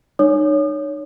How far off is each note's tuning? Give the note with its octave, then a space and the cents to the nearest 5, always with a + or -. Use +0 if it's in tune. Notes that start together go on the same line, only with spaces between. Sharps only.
D#4 -35 C#5 +15 D#6 -45